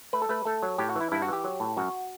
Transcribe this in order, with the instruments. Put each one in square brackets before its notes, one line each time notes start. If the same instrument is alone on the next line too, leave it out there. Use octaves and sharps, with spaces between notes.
[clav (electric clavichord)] A3 B4
A4
A3 B4
A3 A4
F#3
A2 G4
F#4
E3 E4
G2 E4
F#4
E3 G4
F#3
A2
F#2 F#4